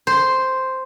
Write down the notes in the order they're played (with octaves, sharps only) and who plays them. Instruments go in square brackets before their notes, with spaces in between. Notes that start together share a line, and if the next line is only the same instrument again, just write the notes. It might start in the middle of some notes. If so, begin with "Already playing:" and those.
[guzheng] C5